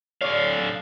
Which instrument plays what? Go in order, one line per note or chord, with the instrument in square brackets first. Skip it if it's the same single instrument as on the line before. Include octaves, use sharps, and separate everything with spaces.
[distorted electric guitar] D3 F5 [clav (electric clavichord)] C#5 D5